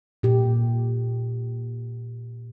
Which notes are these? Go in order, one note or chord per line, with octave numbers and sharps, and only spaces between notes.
A#2 G4